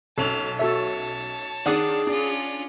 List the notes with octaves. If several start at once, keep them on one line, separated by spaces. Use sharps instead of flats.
B1 C#4 A4 A5 F6 F7
F#4 A4 C#5 E5 A5
D#3 D4 G#4 D5 F#5 D#6
C#4 D4 F4